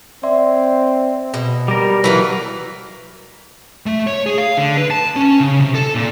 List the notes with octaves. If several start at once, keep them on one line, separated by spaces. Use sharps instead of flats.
C4 D5 E5 C6
B2
G3 A#4
E3 F#3 A3 A#3
A3
C#5
G#4
F5
D3
B4
A5
C#4
C#3
C3
A4
A#2